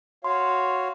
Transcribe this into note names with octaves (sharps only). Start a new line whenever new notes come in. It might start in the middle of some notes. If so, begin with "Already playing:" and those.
F#4 C#5 F5 C6